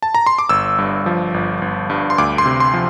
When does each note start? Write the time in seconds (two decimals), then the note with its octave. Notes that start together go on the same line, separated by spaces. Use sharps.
0.02 A5
0.15 A#5
0.26 C6
0.38 D6
0.49 G1 E6
0.78 G2
1.06 F3
1.34 G1
1.62 G1
1.90 G2
2.10 C6
2.18 D2 D6
2.38 C6
2.46 C3
2.60 C6
2.74 F3